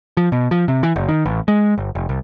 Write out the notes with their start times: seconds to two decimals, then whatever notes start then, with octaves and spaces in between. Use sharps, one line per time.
0.17 F3
0.32 B2
0.51 F3
0.68 C3
0.83 E3
0.96 F#1
1.09 D#3
1.26 A1
1.48 G#3
1.78 G1
1.95 F1
2.09 C2